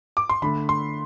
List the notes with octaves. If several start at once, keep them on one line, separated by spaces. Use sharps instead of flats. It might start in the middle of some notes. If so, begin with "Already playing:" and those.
D6
C6
D3 A3 D4 B5
C6